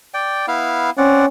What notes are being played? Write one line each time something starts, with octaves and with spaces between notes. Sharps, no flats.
D5 G5
B3 E4 F5
C4 C#4 D5 F#5